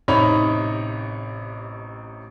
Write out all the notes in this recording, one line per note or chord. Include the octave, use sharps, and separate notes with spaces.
A1 C3 D#4 C#5 B5 F7